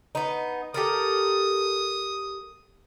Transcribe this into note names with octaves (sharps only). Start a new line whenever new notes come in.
B3 D#4
G4 A4 A#4 D#6